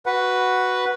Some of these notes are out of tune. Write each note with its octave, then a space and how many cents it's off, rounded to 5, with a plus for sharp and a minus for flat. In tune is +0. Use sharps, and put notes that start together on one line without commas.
F#4 +0 B4 +0 F#5 +0